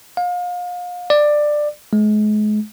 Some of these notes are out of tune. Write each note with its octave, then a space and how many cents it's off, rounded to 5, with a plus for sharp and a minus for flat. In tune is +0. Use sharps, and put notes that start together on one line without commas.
F5 +35
D5 +15
G#3 +35